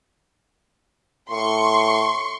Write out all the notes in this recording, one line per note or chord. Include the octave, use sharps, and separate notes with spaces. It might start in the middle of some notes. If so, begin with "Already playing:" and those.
A2 C6 C#6